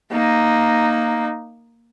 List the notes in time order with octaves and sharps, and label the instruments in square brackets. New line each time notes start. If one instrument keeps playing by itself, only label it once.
[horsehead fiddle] A#3 D#4